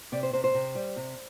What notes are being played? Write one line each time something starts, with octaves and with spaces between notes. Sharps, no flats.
C3 D5
C5
C3 C5
C5
C3
G3
C3